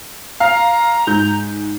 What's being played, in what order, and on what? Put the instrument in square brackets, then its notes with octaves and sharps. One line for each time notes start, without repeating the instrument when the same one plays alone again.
[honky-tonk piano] F5 [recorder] A#5
[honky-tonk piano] G#2 G6